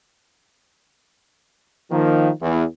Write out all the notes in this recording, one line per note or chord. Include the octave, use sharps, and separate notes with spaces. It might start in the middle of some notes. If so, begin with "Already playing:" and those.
D#3 F3 A#3
E2